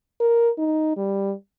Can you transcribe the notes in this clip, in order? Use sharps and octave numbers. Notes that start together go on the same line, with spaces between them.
A#4
D#4
G3